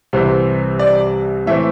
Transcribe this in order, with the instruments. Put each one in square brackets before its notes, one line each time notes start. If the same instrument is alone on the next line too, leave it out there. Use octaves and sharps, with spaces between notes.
[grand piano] C2 C3 E3 C4 C5
D5
A2 E3 A3 C4 E5